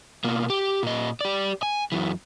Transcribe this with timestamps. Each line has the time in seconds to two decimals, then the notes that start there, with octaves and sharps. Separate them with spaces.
0.24 B2 A#3
0.50 G4
0.83 A#2 D#5
1.21 G4 D5
1.63 G#5
1.92 F#2 E3